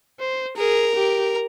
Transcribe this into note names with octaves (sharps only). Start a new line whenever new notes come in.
C5
G#4 A#4
G4